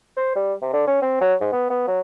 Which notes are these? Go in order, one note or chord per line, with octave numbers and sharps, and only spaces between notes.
C5
G3
C3
D3
C#4
C4
F#3
G#2
B3
B3
F#3